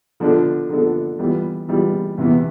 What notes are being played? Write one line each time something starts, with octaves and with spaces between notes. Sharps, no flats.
D3 F3 B3 D4 A4
D3 F3 B3 D4 A4
E3 G3 B3 F4
E3 G3 B3 F4
E2 C3 E3 B3